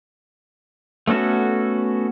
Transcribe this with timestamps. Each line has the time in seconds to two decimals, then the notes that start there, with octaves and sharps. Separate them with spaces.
1.07 A3 B3 C#4 F#4 A4